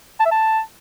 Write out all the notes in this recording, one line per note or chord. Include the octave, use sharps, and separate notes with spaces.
A5
E5
A5